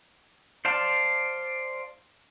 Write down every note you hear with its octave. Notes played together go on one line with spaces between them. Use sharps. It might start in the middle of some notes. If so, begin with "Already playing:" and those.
C5 D5 F5 A5